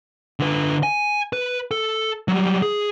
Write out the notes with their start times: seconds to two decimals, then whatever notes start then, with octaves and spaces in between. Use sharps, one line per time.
0.40 D3 B4
0.83 G#5
1.33 B4
1.71 A4
2.28 F#3 G3
2.62 G#4